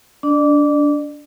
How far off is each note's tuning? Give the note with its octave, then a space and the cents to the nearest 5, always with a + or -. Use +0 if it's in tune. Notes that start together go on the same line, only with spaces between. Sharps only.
D4 -20 D5 +35